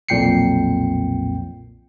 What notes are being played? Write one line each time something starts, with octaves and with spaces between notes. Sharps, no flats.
B1 F2 A#2 G5 C7 C#7